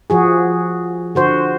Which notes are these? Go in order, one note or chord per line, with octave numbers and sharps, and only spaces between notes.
F3 F#4 G#4
D3 F#4 C5